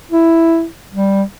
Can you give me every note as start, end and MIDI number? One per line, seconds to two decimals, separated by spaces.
0.12 0.66 64
0.93 1.23 55